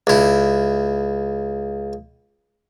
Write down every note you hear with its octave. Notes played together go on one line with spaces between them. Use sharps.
C#2 E4